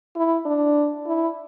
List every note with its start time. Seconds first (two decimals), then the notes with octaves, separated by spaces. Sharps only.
0.16 E4
0.46 D4
1.07 E4